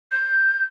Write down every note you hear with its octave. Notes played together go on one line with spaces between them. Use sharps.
G6